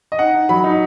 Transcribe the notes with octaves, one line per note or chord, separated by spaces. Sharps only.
D#5
D#4 F#5
D#4
F#3 B5
D#4